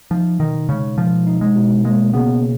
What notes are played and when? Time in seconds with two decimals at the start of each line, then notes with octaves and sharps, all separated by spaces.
0.11 F3 D#4
0.39 B2 D#3
0.69 C#3 G#3
0.98 B2 F3
1.27 D#4
1.41 G#3
1.56 B2
1.85 G#3 A#3
2.13 C#3 B3